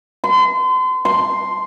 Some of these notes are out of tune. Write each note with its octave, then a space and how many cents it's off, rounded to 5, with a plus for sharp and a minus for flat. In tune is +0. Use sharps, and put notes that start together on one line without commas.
C6 -35
C6 +0